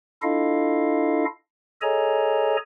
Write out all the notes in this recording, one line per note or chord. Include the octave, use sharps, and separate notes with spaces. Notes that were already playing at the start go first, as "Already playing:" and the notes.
D4 E4 F4 A4 D#5 F5
G#4 A4 C#5 D#5 G#5 A#5